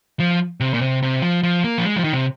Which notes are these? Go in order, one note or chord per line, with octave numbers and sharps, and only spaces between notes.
F3
C3
A#2
C3
C3
F3
F3
A#3
F3
G#3
F3
D#3
C3